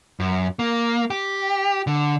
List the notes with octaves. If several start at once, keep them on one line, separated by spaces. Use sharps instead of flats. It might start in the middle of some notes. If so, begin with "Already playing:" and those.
F#2
A#3
G4
D3